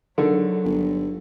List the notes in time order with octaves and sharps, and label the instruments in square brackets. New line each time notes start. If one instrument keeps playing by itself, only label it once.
[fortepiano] D3 [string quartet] F#3 [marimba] D#4 G#4 A#4
[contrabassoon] G1